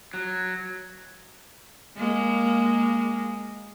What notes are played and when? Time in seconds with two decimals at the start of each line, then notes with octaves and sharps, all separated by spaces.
0.14 F#3
1.97 G#3 A#3